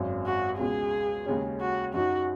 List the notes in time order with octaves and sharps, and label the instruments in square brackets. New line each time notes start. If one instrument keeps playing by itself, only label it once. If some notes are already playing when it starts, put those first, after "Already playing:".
Already playing: [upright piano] G#1 F#2 F#3
[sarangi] F#4
[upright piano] C#2 B2 G#3 [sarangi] G#4
[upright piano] D#2 C#3 G#3 C#4
[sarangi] F#4
[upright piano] F#2 F#3 D#4 [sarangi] F#4